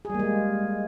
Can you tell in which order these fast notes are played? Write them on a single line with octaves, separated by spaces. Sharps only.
G#4 G3 A#3 G#3